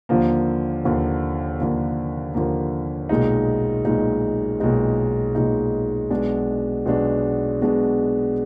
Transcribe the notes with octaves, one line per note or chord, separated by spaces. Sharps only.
D#2 D3 F3 A#3
D#2 D3 F3 A#3
D#2 D3 F3 A#3
D#2 D3 F3 A#3
B1 A#2 G#3 D#4
B1 A#2 G#3 D#4
B1 A#2 G#3 D#4
B1 A#2 G#3 D#4
B1 B2 G#3 D4
B1 B2 G#3 D4
B1 B2 G#3 D4